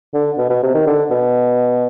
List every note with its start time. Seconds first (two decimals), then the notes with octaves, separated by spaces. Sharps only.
0.14 D3
0.38 B2
0.50 B2
0.63 C3
0.75 D#3
0.87 D3
1.10 B2